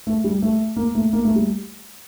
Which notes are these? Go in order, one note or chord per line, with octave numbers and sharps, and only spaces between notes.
A3
G3
A3
A#3
A3
A#3
A3
G3